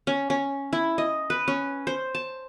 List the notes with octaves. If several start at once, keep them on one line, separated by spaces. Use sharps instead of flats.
C#4
C#4
E4
D#5
B4
C#4
C5
A5